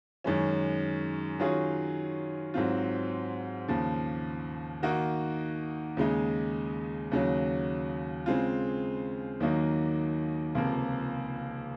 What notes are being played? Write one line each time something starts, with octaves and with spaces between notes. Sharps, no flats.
F#2 D#3 G#3 C#4
D#3 F#3 C#4 F4 G#4
G#2 F#3 C4 F4
D#2 C#3 F3
D#3 A#3 D#4 F#4
D#2 C#3 G#3 D#4
D#2 C#3 F#3
C#3 G#3 C4 F4
D#2 D#3 F#3 A#3 D#4
C#2 C3 F3 A#3